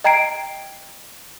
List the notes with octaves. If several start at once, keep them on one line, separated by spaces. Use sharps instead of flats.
D#5 G5 A#5 G#6 C7 D7